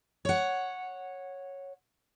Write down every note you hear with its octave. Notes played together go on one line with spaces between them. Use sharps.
C#5 F#5